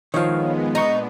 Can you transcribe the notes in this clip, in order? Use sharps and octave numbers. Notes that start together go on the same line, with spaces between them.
D#3 F3 G#3 B3 C#5 F5
A#2 B3 D4 D#4 A#5 C#6